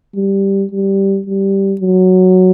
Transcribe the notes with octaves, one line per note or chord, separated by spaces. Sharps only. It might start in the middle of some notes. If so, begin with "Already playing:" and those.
G3
G3
G3
F#3